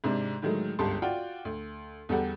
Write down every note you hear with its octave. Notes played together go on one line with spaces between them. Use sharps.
G#2 C3 D4
A2 D3 D#3 F#3 G#3 A3
G1 C#2 G2 G4 A5 C6
F4 F#4 D5 F#5 G5
D2
E2 D3 G3 G4 A4 F#5